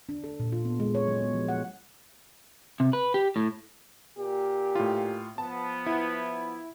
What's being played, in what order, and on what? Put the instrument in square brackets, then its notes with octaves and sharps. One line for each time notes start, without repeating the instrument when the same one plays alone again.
[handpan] D4
A4
A#2
F4
B3
G#3
C#5
F#3
B3
F3
F#5
[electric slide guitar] C3
B4
G4
A2
[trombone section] A#2 G4
[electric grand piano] A2 F4
[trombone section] F3 B3 [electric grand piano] A5
[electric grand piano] E4